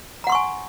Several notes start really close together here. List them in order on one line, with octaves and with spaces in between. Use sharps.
A#5 F#5 C6 C#6 G#5